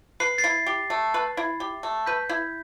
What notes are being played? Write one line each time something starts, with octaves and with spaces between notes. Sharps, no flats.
B4 C7
A6 C7
E4
G4
A3
B4
E4
G4
A3
B4 G6 B6
E4